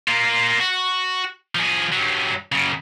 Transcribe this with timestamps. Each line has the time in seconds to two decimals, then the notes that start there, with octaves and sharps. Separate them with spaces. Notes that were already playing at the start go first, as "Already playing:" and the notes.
0.08 A#3 F4
0.60 F#4
1.55 F3 G#4
1.92 G2 F#3
2.52 F#2 C#3